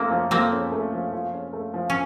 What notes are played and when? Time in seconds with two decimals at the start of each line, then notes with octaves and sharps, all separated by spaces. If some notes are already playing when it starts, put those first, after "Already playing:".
Already playing: F3 A3 A#3 C4 C#4
0.11 F3
0.31 F3 A#3 C4
0.52 C#4
0.72 A3
0.93 F3
1.13 F3
1.33 C#4
1.53 A3
1.74 F3
1.90 C#4